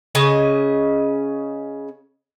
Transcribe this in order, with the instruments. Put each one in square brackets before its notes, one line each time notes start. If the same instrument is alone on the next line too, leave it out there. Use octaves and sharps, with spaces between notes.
[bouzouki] C#3 C#4 D#5 G#5